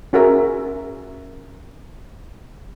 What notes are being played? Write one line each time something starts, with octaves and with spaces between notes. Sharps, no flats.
C#4 F#4 G#4 A#4 E5